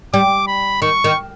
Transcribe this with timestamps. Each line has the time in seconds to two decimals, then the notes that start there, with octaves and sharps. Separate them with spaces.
0.14 G3 D6
0.48 B5
0.82 D#3 C#6
1.04 D#3